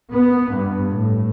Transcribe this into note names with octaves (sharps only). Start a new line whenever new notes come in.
B3
G2
A2